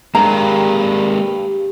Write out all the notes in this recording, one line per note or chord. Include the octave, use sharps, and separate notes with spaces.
G2 G#3 A#3 A#5